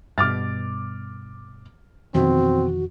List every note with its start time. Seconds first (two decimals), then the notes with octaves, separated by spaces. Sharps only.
0.18 G2 B2 D6 F6 A6
2.15 F2 B2 D#3 E3 C4 F#4